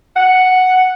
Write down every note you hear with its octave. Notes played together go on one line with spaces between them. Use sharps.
F#5